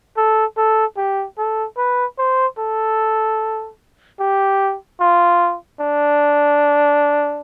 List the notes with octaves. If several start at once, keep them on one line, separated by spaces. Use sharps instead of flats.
A4
A4
G4
A4
B4
C5
A4
G4
F4
D4